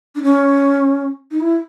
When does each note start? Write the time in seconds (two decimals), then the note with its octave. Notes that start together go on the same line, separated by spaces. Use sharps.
0.15 D4
0.22 C#4
1.31 D#4
1.40 E4